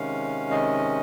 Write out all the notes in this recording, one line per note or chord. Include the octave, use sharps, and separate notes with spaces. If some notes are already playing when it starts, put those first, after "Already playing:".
Already playing: C3 D#3 G#3 C#4 F5
D#5